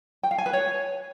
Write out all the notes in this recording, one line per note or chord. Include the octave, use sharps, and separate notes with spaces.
G5
F5
G#5
B4
C#5